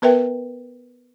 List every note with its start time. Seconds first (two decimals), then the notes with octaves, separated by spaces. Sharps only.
0.02 B3 A#4 B4 E5 G5